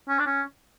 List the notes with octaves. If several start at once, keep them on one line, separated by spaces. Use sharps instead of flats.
C#4
D4
C#4